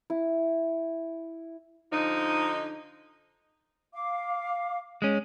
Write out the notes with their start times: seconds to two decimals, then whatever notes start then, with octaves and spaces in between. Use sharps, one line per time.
0.10 E4
1.91 D3 F3 D#4
3.93 F5 D6
5.02 G#3 C#4